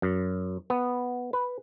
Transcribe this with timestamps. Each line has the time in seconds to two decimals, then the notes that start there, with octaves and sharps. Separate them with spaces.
0.02 F#2
0.70 B3
1.33 B4